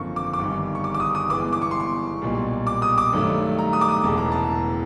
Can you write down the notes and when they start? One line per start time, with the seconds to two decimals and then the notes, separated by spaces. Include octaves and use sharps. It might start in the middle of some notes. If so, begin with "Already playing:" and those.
Already playing: G#1 F#2 D3 F3 A#3 C#6
0.16 D6
0.33 D6
0.39 G1 G2 D#3 C#6
0.75 C#6
0.84 D6
0.94 D6
1.00 D#6
1.15 D#6
1.30 G1 G2 E3 G#3 B3 D6
1.53 D6
1.62 C#6
1.71 C6
1.80 C#6
2.22 B1 A#2 G3
2.67 D6
2.82 D#6
2.98 D6
3.12 G2 D#3 F#3 A3
3.59 A#5
3.73 D#6
3.81 D6
3.89 D#6
4.04 E1 E2 C#3 E3 G#3 A5
4.18 A#5
4.32 A5